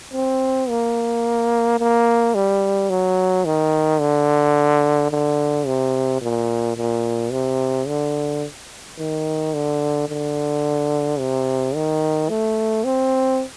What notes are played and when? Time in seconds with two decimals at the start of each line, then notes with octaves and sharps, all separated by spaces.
0.14 C4
0.69 A#3
1.79 A#3
2.35 G3
2.90 F#3
3.45 D#3
4.00 D3
5.11 D3
5.67 C3
6.22 A#2
6.77 A#2
7.32 C3
7.87 D3
8.98 D#3
9.54 D3
10.09 D3
11.19 C3
11.75 D#3
12.30 A3
12.85 C4